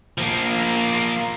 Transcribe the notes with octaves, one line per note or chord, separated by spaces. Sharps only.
F3 A#3